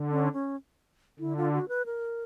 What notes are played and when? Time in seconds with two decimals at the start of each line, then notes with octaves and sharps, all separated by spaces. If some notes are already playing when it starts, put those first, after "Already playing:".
Already playing: D3
0.11 C#4
0.33 C#4
1.20 D3 E4
1.37 F4
1.53 F#4
1.68 B4
1.86 A#4